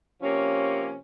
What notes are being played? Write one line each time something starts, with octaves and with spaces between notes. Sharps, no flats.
C3 F3 A#3 C#4